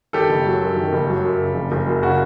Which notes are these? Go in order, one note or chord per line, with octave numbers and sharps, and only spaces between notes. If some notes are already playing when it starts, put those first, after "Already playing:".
D#3 G4 A4
F#1
F#3
F#2
D#3
F#1
F#3
F#2
C#3
F#1
F#1
F#2
C#3 F#4